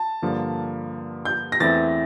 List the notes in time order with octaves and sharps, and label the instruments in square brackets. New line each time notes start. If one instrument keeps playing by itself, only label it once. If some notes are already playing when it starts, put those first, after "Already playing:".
Already playing: [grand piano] A5
[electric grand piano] G2 D3 F3 A#3
[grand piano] G6
A#6
[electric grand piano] E2 E3 A3 C4 E4 [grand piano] A6